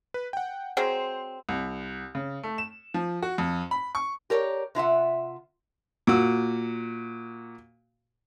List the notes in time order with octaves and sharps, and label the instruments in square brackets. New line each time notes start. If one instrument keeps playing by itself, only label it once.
[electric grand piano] B4
F#5 G5
[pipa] F#3 G#3 C4 [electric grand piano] C5
[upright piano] C2
C#3
A3
E7
F3
F#4
F2
B5
C#6
[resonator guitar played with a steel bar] G4 A#4 C#5 D5
C3 F4 E5 F#5
[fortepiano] A#2 F#4 E6